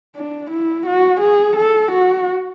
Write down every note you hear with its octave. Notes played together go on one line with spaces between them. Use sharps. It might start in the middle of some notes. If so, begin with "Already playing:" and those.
D4
E4
F#4
G#4
A4
F#4